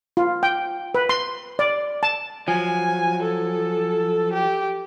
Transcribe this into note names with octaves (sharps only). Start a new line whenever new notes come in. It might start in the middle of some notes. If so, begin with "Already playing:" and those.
F4
G5
B4
C6
D5
A5
F3 F#3 G#5
A4
G4